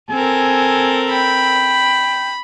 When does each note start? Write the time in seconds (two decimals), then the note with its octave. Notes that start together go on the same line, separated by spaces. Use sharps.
0.10 C4 A4 A#4 G#5
1.11 G5 B5